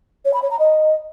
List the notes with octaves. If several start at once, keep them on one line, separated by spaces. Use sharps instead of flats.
C#5
B5
C#5
A#5
D#5